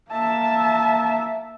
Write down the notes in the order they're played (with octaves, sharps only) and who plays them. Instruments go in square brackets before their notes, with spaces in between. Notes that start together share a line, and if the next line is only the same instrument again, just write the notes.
[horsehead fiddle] A#3 E5 [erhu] A5